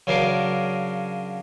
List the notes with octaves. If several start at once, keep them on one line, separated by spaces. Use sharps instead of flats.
C#3 F#3 D4 A#4 F5 D6